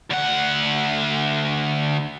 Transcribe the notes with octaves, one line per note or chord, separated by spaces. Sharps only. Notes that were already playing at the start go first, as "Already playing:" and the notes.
D2 F#5